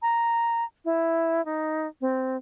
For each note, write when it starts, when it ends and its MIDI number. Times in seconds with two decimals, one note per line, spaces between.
0.02 0.64 82
0.85 1.44 64
1.45 1.87 63
2.01 2.37 60